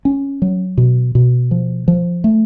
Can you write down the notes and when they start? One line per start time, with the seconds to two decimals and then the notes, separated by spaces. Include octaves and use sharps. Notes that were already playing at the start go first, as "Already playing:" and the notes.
0.05 C#4
0.42 F#3
0.78 B2
1.15 B2
1.51 F3
1.88 F3
2.24 A3